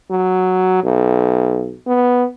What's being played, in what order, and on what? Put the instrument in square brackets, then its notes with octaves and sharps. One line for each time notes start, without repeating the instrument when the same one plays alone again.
[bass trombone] F#3
B1
B3